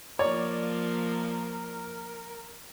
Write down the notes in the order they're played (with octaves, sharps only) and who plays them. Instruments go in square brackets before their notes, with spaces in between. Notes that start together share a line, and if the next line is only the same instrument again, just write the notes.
[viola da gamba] F3 A#3 [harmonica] A#4 [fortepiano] C#5 [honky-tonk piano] D5